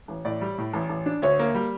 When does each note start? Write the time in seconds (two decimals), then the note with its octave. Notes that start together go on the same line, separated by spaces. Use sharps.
0.08 A1
0.25 A2 D5
0.41 G3
0.58 A2
0.74 A1
0.89 A1
1.06 D4
1.22 D2 C#5
1.39 A#3
1.55 G3